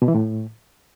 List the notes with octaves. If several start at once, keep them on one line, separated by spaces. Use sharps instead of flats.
B2
E3
A2